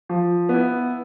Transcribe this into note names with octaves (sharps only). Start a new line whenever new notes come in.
F3
B3 E4